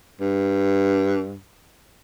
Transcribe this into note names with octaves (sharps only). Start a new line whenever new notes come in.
G2